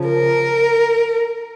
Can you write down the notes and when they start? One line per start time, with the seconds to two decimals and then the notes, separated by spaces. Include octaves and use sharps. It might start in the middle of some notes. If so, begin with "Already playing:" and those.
Already playing: C#3 F3
0.09 A#4